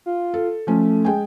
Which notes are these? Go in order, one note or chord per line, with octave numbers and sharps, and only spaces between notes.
F4
A4
F3 A3 C#4
G#3 G5 G#5